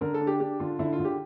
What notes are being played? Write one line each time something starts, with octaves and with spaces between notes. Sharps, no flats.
D3 A#4
A4
D4
G4
D4 G4
D3 F4
D3 E4
F4
D3
G4